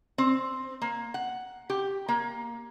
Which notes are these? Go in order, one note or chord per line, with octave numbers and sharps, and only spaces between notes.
C4
A#3
F#5
G4
A#3